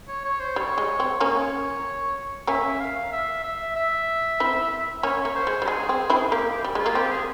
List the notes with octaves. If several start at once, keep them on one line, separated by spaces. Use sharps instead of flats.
C#5
C#5
C5
G3 C#5
G#3
C4
A#3 C#4 C#5
A#3 C#4 E5
F5
E5
E5
E5
C4 E4
A#3 C#4 C#5
A#3
C5
G#3
G3
G#3 G#4
C4
C4 E4
A#3 G4
G4
G3
G#3 F4
A#3
C4 G4
G#4